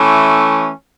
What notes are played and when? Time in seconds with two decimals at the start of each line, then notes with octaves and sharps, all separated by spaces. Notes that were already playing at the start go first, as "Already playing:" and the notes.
Already playing: E3 A3 C#4